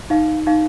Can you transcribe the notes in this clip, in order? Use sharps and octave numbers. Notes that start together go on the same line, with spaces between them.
D#4 F5
D#4 F5